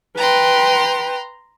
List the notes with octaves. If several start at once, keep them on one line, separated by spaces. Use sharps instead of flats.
B4 G5 A#5 C6